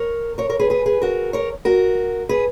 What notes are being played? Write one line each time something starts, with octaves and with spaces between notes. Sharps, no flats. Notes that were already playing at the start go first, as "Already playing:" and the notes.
Already playing: A#4 C#5
A#4 C#5
A#4 C#5
G#4 B4
G#4 B4
G#4 B4
F#4 A#4
A#4 C#5
F#4 A#4
G#4 B4